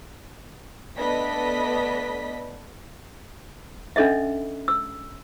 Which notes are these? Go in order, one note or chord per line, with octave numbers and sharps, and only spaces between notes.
A3 B3 D4 D#5 B5 B6
C#4 D4 A4 D#5 E5
E6